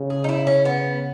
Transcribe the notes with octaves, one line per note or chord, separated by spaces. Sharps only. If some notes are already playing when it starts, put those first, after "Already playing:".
Already playing: C#3
G#4
D#4
E4
C#4
B3